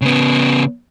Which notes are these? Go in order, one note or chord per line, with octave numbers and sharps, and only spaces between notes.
C#3 B3